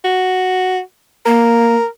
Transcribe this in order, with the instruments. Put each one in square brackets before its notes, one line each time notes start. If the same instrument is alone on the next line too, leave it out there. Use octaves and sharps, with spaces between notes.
[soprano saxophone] F#4
[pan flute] A#3 [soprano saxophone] A#4